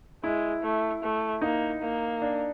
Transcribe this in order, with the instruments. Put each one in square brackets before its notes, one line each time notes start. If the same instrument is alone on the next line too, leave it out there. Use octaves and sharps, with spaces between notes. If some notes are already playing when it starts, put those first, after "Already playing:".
[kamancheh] G#3 [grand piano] E4
[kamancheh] A3
A3
[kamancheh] A#3 [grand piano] D#4
[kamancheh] A#3
[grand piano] D4